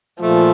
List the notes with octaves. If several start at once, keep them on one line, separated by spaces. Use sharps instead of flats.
A#2 F3 A3